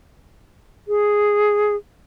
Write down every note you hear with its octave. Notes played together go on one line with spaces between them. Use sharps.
G#4